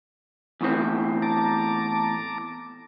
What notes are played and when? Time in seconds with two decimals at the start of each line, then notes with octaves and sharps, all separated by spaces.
0.61 E2 A2 C4
1.22 A5 A#5 D6